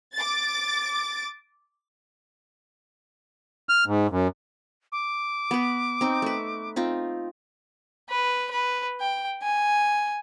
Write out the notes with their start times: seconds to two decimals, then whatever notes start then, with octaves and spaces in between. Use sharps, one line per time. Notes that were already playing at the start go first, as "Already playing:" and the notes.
0.15 D6 A6
3.69 F6
3.86 G#2
4.11 F#2
4.92 D6
5.51 B3 B4
6.01 C4 D#4
6.22 A3 B4
6.76 C4 D#4 F4
8.10 B4
8.51 B4
9.01 G5
9.43 G#5